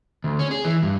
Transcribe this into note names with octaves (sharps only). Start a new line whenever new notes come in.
D2
C#4
G#4
E3
G2